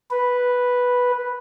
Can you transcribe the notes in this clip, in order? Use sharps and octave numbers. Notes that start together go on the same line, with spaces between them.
B4